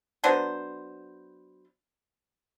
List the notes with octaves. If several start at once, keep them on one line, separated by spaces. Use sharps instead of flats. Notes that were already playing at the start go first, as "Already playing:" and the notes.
F#3 B3 D4 C5